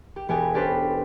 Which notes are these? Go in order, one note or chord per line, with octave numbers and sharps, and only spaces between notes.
G4
E1 B3 G4 G#4 G#5
C#4 D4 G4 A4 B4 C5